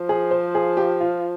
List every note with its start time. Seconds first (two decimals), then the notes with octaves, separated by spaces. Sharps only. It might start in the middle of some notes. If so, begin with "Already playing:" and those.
Already playing: F3
0.09 G#4
0.31 C5
0.55 G#4
0.77 G4
1.01 F4